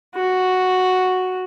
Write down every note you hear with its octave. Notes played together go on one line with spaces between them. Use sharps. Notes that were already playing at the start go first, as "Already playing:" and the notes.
F#4